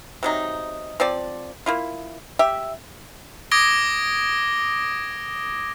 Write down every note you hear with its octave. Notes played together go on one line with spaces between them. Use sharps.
C3 F#3 D#4
F3 C4 D5
A#3 E4 F4
G4 E5
D6 D#6 G#6 A#6 D7 G7